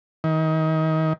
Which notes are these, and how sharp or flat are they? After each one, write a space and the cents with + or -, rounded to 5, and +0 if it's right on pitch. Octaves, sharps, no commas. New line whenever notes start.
D#3 +30